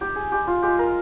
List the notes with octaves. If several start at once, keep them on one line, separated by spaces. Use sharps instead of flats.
D#4 G4
G#4
G#3 G4
F4
G#3 G4
A#4